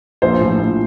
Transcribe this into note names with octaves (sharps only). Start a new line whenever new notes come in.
A#1 C5
A2 F3
A#1